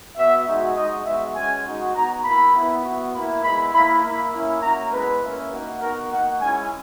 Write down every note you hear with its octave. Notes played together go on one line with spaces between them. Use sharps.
B3 F#4 E5
G#3 D#4 F#4
G#3 D#4 F#4 D#5
G#3 B3 F#4 E5
G#3 C#4 F#4 G#5
G#3 D#4 F#4
B3 F#4 A#5
A#3 E4 B5
B3 E4
B3 F#4
A#3 E4 B5
G#3 B3 E4 B5
A#3 E4 B5
A#3 E4 B5
A#3 C#4 E4
A#3 C#4 F#4 A#5
G#3 B3 E4 B4
A#3 C#4 E4
A#3 D#4 F#4
B3 D#4 F#4 A#4
A#3 D#4 F#4 F#5
G#3 C#4 E4 G#5